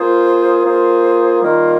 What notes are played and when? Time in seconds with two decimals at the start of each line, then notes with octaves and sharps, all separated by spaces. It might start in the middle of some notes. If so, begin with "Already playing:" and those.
Already playing: A#3 F4 G#4 C5
0.64 A#3 F4 G#4 C5
1.42 D#3 G3 A#3 F4